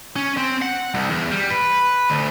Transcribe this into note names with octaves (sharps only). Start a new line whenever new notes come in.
C#4
C4
F#5
C2
E2
G3
B4
D2